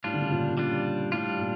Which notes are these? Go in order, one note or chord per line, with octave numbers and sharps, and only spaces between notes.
A2 G3 D4 F4
D3
C#3
A#2
A#2
C#3 G3 D4 F4
A2 G3 D4 F4
A#2